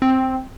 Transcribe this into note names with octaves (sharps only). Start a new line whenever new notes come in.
C4